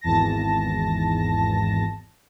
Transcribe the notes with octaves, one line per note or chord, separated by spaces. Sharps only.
G#1 E2 A5 A#6